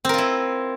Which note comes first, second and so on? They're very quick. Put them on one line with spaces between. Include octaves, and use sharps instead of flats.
C4 A#4 F4 E4